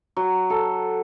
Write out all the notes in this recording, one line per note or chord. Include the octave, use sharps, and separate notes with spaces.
F#3
A4